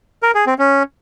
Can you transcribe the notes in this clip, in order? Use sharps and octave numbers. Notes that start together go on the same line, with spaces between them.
A#4
G#4
C4
C#4